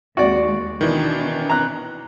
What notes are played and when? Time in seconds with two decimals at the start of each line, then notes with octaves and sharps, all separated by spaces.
0.17 D#2 G#3 F#4 D5
0.81 B2 D#3 E3 D4
1.50 A#5 F#6